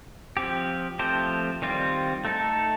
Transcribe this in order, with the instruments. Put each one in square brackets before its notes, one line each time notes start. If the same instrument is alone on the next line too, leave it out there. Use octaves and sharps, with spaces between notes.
[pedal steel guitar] F3 C4 G4
F3 A3 C4 G4 C5
D#3 G3 C4 F4
A3 D#4 A4